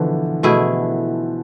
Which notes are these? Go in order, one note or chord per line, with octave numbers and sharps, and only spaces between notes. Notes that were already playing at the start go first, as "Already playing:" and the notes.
Already playing: B2 D3 E3 F3 A3 G#4
B2 A3 E4 G#4